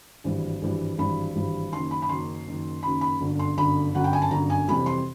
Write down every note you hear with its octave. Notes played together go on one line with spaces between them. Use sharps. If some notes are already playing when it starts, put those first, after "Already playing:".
G#1 G2 E3 G3
G#1 G2 E3 G3
G#1 G2 E3 G3 B5
G#1 G2 E3 G3
F#1 F#2 D#3 C6
B5
B5
F#1 F#2 D#3 C6
F#1 F#2 D#3
F#1 F#2 D#3 B5
B5
G1 F#2 D3
C6
G1 F#2 D3 B5
G1 F#2 D3 F#5
G5
G#5
A5
G1 F#2 D3 A#5
G#5
F2 C3 E3 G3 B5
C6